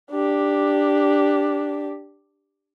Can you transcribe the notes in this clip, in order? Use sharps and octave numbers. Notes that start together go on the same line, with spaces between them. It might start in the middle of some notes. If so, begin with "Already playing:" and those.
D4 G4